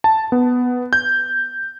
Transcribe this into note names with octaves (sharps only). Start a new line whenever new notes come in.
A5
B3
G6